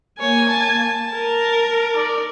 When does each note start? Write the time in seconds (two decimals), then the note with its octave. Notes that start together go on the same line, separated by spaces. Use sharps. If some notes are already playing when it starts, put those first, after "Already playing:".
0.20 A#3 C#5 G#5
0.49 A5
1.14 A#4
1.95 D#4 D5